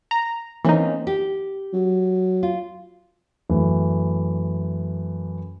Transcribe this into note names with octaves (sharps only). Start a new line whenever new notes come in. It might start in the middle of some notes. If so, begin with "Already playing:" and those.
A#5
E3 A#3 C4 C#4 D#4
G4
F#3
F4
F#2 E3 A3